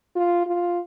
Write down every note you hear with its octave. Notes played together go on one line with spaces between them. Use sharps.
F4
F4